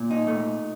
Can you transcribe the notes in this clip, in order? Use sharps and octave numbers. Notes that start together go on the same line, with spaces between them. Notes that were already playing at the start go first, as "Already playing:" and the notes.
Already playing: A#2
D#4
A3